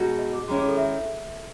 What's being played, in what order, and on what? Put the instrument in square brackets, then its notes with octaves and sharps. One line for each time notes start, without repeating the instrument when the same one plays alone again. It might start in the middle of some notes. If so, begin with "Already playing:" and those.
Already playing: [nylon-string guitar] B2 G#3 D#4 F#4
[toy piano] D#5
G#4
[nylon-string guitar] D#3 G#3 C#4 E4 [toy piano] F#4
[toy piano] G#4
A4
E5